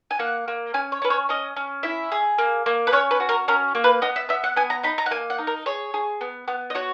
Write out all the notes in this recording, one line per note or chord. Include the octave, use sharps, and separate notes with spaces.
G#5
A#3 F#5
A#3
C#4 G#5
C#5
C#4 B4
C#5
C#4 D#5
C#4
E4 E5
G#4
A#3
A#3
B4
C#4 C#5
B4
F#4
A#4
C#4 A#4
A#3
B4
B3 D#5
E5
B3 E5
F#5
B3 G#5
A#5
D#4 B5
A#5
F#5
A#3 G#5
F#5
D#4
A#4
G#4 C#5
G#4
B3
B3
D#5
F#4 C#5